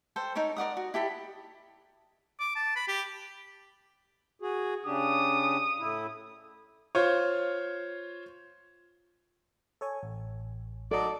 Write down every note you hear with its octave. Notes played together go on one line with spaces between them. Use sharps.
A4 C5 G5
D#4 A4 A#4 C#5
A#4 D5 F#5 D#6
F#4
E4 G4 A4 B5
D6
A5
B5
G4
F#4 G#4
C#3 D4 G4 D#6
A2 E4
F4 C5 C#5
A4 C#5 G#5
A1
F#3 D#4 A4 D5